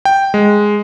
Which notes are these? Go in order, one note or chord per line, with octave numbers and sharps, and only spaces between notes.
G5
G#3